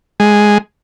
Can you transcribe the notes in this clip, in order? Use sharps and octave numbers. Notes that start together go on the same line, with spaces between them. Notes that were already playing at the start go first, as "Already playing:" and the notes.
G#3